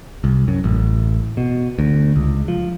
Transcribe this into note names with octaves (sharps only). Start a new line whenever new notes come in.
C2
F#2
A1
B2
D2
C#2
F3